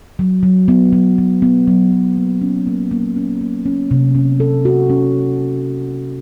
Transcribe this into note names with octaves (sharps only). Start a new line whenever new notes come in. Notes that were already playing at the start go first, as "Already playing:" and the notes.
F#3
F#3
B3
F#3
F#3
B3
F#3
F#3
A#3
C#4
A#3
A#3
C#4
A#3
C#4
C3
C#4
A4
F#4
C#4